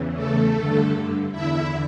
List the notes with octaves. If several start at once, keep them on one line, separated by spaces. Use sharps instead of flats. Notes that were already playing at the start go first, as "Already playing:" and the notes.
Already playing: E2 C#3 E3
A3 A4
G2 D3
E2 D3 E4 E5